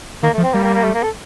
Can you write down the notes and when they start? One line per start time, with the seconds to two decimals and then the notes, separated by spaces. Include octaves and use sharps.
0.23 D#3 A#3
0.34 A3
0.38 F3
0.43 C4
0.53 G3 A#3
0.63 A#3
0.74 A#3
0.84 A3
0.94 A#3
1.03 A4